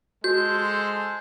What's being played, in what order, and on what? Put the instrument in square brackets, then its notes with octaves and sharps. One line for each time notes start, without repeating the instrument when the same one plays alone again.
[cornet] G#3 [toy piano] F#4 [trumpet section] A4 C5 [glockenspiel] G6